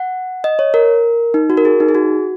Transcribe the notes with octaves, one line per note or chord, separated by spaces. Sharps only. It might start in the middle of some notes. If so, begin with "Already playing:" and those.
Already playing: F#5
D#5
C#5
A#4
D#4
F#4
A#4
G#4
D#4
G#4
F#4